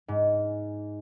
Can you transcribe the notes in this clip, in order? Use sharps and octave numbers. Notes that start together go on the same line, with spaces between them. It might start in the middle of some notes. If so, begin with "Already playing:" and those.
G#2